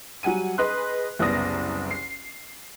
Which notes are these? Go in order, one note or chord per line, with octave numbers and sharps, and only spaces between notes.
F#3 G3 F#5 G#5 D#7
G#4 B4 D#5 C6 F#6
F#1 C2 B3 D5 D#6 A#6
C7